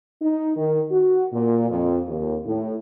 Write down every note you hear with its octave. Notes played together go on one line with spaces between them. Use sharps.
D#4
D#3
F#4
A#2
F2
D#2
A2